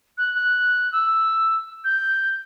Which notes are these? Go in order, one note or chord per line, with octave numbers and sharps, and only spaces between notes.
F#6
F#6
E6
G6